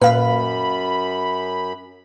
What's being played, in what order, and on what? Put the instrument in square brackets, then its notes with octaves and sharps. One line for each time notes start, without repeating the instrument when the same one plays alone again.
[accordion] F#2 B5 [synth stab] A#2 [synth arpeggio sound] B4 F5